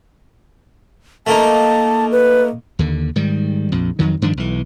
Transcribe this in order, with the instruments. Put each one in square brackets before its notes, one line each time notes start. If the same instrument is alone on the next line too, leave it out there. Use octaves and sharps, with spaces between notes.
[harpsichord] A3 A#3 D#4 [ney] A5
[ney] B4
[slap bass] D#2 D3
G#2 D#3 G3
A#1 F2
F2 D#3 F#3
G2 D#3 F3 D4
B1 E3